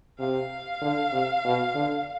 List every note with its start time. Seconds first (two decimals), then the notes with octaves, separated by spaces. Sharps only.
0.19 C3 F5
0.81 D3
1.12 C3
1.44 B2
1.75 D3